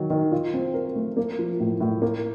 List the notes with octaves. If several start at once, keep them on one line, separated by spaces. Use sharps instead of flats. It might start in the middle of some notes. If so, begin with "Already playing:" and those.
Already playing: D#3 F#3
D#3
F4
C4
A#4
A3
A#3
F3
A2
A2
A#3